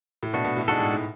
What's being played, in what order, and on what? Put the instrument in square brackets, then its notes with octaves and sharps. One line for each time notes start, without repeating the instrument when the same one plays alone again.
[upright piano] A2
[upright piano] B2 [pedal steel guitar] A3 D4 F#4
[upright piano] B2
A2
[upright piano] G#2 [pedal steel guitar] G#3 D4 F#4 A4
[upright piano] A2
G#2